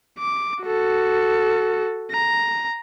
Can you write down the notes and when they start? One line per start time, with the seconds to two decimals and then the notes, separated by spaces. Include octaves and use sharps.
0.19 D6
0.64 F#4 A4
2.12 A#5